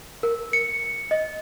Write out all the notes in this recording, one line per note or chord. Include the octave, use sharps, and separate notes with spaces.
A#4
C#7
D#5